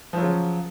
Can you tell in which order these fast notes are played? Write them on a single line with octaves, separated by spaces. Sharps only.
F3 F#3 C#3